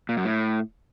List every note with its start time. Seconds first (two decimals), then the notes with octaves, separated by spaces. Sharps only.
0.09 A#2
0.17 F#2
0.25 A2